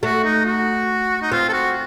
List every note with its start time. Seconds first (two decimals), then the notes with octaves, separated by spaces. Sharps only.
0.03 A3 F#4
0.24 D#4
0.46 F#4
1.22 D#4
1.32 C4 F4
1.49 A4
1.53 F#4